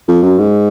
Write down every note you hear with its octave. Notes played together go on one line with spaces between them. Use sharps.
F2
F#2
G#2